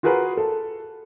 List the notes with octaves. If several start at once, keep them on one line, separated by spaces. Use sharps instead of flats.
F4 F#4 G#4 A#4 B4
A4